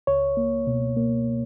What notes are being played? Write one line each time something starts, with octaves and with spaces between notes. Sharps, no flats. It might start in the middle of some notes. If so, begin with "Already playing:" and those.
C#2 C#5
A#3
B2
A#3